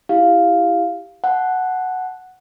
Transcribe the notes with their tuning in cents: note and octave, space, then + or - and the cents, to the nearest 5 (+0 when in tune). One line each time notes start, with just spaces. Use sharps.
E4 +0 G4 +0 F5 +0
F#5 +0 A5 -20